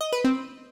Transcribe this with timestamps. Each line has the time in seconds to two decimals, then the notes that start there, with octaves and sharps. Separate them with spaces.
0.01 D#5
0.12 B4
0.24 C4